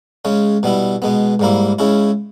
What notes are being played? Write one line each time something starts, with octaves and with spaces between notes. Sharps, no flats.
C#3 G#3 C#4
B2 G3 B3 E4
B2 G#3 B3
G#2 G3 A#3 E4
C#3 G#3 C#4 E4